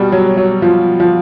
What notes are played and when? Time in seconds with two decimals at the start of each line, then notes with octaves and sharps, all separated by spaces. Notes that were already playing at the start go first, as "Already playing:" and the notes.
Already playing: B2 G3
0.12 F#3
0.37 F#3
0.62 B2 F3
1.00 F3